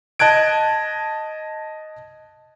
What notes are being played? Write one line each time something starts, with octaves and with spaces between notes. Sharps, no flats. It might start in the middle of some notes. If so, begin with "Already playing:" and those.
D#5 A5 F#6 G#6 D7